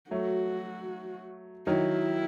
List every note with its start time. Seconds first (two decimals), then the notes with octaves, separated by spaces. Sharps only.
0.11 F#3 A3 F#4
1.67 D#3 F#3 E4